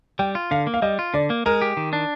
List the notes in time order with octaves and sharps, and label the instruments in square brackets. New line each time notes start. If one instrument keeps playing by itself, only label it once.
[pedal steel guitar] G3 [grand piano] G5
[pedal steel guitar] F4
[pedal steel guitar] D3 [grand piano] F5
[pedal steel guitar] A#3
[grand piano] F5
[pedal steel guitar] G3 [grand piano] D#5
[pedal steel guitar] F4
[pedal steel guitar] D3 [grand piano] D5
[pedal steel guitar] A#3
[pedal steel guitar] G#3 [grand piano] A#4
[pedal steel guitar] G4
D#3
D4